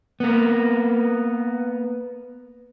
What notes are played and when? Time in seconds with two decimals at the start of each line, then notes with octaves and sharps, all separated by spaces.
0.20 A#3 B3